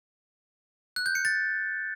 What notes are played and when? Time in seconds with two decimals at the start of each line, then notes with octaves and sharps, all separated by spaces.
0.96 F#6
1.06 G6
1.15 C#7
1.25 A6